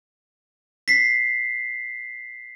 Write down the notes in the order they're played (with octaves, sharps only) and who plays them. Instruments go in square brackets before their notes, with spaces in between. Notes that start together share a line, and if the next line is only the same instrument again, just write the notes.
[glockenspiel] B6 C7